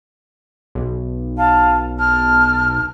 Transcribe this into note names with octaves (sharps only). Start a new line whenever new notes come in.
B1
F5 A5
A5 F6